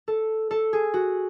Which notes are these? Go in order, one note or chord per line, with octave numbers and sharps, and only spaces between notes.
A4
A4
G#4
F#4